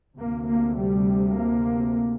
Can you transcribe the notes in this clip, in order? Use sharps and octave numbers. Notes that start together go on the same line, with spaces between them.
D2 C3 A#3
A#3
G3
A#3